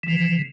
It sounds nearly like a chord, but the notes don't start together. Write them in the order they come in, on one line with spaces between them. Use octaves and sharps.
E3 F3 C#3